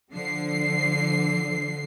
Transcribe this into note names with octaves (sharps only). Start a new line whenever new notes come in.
D3 F3 C7